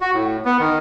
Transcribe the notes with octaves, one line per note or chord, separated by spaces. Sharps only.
F#4
A2
B3
D#3